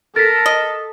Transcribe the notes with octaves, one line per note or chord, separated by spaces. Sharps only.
A4 A#4 A6 B6
D#5